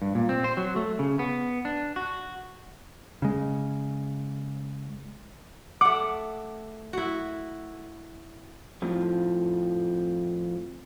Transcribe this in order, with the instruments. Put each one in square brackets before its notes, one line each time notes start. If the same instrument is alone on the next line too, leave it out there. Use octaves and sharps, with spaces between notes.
[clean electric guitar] G2
A#2
C4
C5
F#3
A3
C#3
B3
D4
F#4
[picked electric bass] C#3 G#3
[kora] A3 F#5 [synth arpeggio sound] D6
[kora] E4 F#4
[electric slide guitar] F2 A2 F3